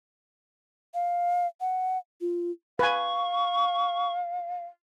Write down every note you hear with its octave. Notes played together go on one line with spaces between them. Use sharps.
F5
F#5
F4
B4 F5 G#5 C#6